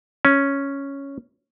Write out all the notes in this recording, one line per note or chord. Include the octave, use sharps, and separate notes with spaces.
C#4